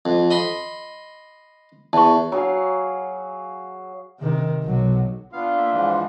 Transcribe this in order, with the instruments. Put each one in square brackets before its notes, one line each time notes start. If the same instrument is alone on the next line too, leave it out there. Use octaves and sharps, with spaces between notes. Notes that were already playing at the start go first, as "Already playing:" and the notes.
[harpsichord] F2
D#5 B5 C6
[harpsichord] E2 [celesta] A5 C#6
[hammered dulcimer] F#3 G#4 F5
[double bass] C3 D#3
B1 F#3
[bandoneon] B3 F5 [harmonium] D4 F4
[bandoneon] A#3 E5
G#2 E3 F3